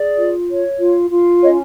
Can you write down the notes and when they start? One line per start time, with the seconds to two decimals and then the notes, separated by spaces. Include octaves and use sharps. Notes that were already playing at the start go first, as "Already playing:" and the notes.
Already playing: G#4 D5
0.17 F4
0.48 C#5
0.79 F4
1.10 F4
1.41 C#4 C#5 D#5